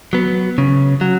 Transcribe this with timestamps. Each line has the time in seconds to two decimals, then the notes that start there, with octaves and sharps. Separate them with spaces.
0.13 F#3 B3
0.58 C#3
1.01 F#3